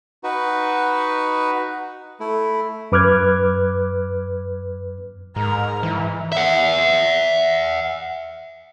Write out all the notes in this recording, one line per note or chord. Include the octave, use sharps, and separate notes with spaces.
D#4 F#4 B4
A3 E4
F#2 B4 D6 F6 F#6 G#6
G#2 A#4
E3
E5 F#5